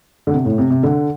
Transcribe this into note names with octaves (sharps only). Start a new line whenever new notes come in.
D3
C3
A2
C3
C3
D3